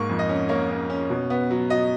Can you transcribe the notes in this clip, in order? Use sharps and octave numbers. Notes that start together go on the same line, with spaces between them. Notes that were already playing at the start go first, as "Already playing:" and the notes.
Already playing: G#2 A#3 C#6
F2
D#5
C#4
A#3 C#5
C#4
C#4
B2
B3
F#3
F#3 D#5